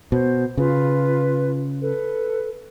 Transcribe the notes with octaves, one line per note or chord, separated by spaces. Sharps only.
B2 C5
C#3 F4 B4
A4 B4